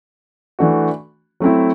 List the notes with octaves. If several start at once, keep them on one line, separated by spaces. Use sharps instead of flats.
E3 A3 D4 F#4
F#3 A3 C4 E4